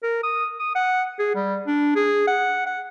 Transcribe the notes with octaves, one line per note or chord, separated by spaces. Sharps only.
A#4
D#6
D#6
F#5
G#4
G3
D4
G#4
F#5
F#5